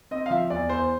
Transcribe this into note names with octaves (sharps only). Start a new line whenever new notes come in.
C4 D#5
F5
F3 E5
E2 D5
E2 C5